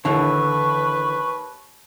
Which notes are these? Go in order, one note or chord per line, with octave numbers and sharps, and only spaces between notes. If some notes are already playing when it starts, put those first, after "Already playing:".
D#2 D3 E3 B4 C#6